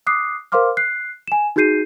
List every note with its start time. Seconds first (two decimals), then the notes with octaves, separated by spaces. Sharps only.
0.07 D6 D#6 F#6 C7
0.52 A#4 C5 F5 C6 D6 F6
0.77 F#6 C7
1.28 G#5 E7
1.56 D#4 F#4 G#4 G6 C7 D#7